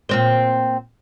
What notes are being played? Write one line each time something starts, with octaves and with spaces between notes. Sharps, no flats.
A#2 C4 C5